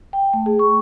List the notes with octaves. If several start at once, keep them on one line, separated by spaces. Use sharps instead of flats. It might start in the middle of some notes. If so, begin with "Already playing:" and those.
G5
A3
G#4
C#6